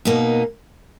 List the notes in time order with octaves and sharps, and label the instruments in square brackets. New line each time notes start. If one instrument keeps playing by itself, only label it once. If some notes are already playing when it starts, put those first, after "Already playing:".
[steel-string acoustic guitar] B2 A#3 D#4